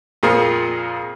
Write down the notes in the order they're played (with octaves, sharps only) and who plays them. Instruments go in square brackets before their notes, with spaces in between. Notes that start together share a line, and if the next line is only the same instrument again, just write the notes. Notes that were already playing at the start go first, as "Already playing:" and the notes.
[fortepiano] F2 A#2 F4 G#4 A#4